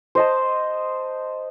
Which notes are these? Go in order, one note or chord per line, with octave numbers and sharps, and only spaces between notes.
C5 D#5 A5